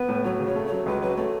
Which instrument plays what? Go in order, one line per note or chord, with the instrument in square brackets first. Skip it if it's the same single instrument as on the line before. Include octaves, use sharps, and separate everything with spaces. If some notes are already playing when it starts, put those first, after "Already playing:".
Already playing: [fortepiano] B3 [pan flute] B4
[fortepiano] A2
[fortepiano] F#3 [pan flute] C#5
[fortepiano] C#3
[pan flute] C#5
[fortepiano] A3
[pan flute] C#5
[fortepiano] F#3
[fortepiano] C#2 [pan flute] B4
[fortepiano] F#3 [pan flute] B4
[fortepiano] A3 [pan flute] C#5